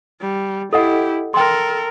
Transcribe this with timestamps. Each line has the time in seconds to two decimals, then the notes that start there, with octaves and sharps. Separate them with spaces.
0.21 G3
0.73 E4 G4 A4 D#5 F#5
1.34 A4 A#4 G5 C6